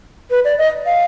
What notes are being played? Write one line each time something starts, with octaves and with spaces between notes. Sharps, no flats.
B4
D5
D#5
F5